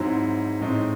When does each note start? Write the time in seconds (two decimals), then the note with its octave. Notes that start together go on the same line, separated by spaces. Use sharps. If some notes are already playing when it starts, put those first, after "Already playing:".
Already playing: G#2 F#3 C4 E4
0.61 A2 G#3 C4 D#4